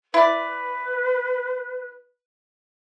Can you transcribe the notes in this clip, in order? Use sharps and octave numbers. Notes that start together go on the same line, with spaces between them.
E4 B4 D5